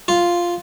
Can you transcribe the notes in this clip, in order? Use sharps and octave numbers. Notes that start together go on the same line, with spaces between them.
F4